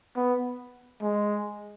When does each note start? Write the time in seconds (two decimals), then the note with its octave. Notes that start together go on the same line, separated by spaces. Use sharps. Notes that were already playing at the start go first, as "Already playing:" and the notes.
0.17 B3
1.02 G#3